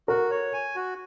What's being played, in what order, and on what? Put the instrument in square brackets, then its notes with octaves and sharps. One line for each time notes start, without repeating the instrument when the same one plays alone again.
[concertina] F#4 [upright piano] A#4
[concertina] C#5
G#5
F#4